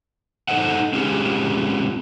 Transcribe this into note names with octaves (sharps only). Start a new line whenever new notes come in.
D#4 A4 C5 D#5 F#5
G#3 C4 C#4 F4 G4 G#4